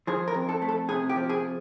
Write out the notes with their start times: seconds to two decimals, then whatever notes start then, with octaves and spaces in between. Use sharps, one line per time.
0.07 F3 G#4
0.28 A#4
0.35 F2
0.49 A4
0.62 A3
0.69 A4
0.89 C3 G#4
1.09 G4
1.16 F3
1.30 G#4